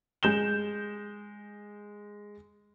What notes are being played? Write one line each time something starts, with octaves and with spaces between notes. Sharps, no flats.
G#3 G6 E7 G7